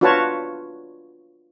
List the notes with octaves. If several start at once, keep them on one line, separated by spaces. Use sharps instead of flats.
D4 F4 F#4 B4 C#5 A5